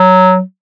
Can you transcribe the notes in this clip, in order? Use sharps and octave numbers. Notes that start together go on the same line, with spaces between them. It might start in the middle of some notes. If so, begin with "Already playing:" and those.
Already playing: F#3